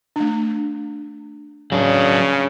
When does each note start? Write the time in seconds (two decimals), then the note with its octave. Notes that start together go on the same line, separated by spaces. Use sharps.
0.16 A3 D4
1.72 C#3 F#3 D4